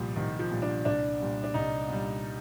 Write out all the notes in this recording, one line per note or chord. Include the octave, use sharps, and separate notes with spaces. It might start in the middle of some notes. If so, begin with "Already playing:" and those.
Already playing: C2 A#2 F3 G3
C2 D#3
F3
A#2 G3
D4
C2 D4
A#2 G3
D4
C2 D#4
A#2 G3